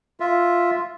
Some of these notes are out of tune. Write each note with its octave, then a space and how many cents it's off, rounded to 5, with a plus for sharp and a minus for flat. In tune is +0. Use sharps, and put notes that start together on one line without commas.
F4 +0 E5 +0